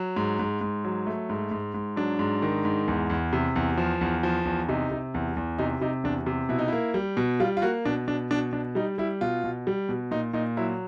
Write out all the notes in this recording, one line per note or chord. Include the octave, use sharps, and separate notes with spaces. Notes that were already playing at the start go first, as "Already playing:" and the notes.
Already playing: F#3
G#2
G#2
G#2
F#3
A3
G#2
G#2
G#2
F#3 D4
G#2
D#3
G#2
E2
E2
C3
E2
F3
E2
F3
E2
C3 D#4
C3
E2
E2
C3 D#4
C3 D#4
E2 D4
C3
B2 E4
D#4
A#3 E4
G3
B2
G3 F4
F4
A#3 F#4
B2 D4
B2 D4
B2 D4
B2 D4
G3 D#4
G3 E4
B2 F4
B2
G3
B2
A#2 D#4
A#2 D#4
F#3 E4